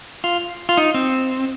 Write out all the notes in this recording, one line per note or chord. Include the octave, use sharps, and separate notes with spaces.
F4
F4
D#4
C4